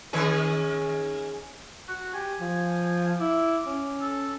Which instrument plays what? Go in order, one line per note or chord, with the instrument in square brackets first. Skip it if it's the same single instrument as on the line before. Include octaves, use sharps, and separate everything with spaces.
[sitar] D#3 C#4 G#4
[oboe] F#4
[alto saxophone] G4 [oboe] G#5
[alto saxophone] F3
[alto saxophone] E4 [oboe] D6
[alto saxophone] C#4
[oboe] A4